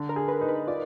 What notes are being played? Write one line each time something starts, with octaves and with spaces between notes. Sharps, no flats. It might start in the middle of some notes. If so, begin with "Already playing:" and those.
Already playing: D3
A#4
G#4
B4
D#4
B4
F4 D5